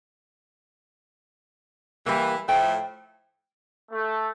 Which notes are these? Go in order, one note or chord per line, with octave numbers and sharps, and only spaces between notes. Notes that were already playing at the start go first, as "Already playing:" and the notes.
E3 G3 A#3
A2 F3 A3 G5
A3